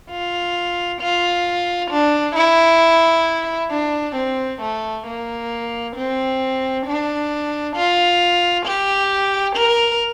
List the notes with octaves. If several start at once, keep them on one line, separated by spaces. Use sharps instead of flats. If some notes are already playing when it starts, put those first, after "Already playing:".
F4
F4
D4
E4
D4
C4
A3
A#3
C4
D4
F4
G4
A#4